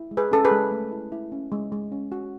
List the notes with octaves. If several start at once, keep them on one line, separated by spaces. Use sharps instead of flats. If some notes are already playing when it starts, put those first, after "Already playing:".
Already playing: E4
G#3
G#4 B4
C#4 A4
G#4 B4
G#3
A3
E4
E4
C#4
G#3
G#3
C#4
F#4